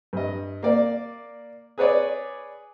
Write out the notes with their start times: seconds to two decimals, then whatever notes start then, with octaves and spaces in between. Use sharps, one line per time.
0.13 G2 D#5
0.63 A#3 D5
1.78 G#4 B4 C#5 D5